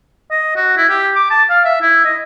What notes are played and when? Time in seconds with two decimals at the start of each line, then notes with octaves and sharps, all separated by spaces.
0.31 D#5
0.56 F#4
0.77 E4
0.89 G4
1.16 D6
1.30 A5
1.50 F5
1.65 E5
1.81 E4
2.05 D#5